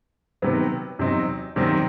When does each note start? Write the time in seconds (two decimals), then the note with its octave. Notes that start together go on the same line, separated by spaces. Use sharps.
0.42 C3 D#3 F#3 B3
0.99 E2 C3 F#3 C4 D#4
1.56 E2 C3 D#3 F#3 C4